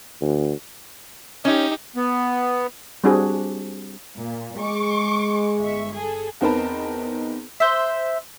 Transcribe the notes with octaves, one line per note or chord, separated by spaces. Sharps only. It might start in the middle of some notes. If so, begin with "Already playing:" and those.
D2
C#4 D#4 G4
B3
G3 C4 D4 F#4 G#4
A#2
G#3 C#6 D6
G1 E5 C#6
G#4 A4
E2 C4 D#4 A#4 B4 A5
C5 E5